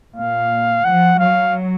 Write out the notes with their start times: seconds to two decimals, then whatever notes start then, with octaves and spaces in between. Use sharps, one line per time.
0.15 A#2 F5
0.84 F3 F#5
1.18 F#3 F5